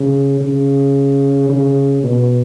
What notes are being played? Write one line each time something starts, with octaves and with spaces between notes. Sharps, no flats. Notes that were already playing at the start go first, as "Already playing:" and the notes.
Already playing: C#3
C#3
C#3
B2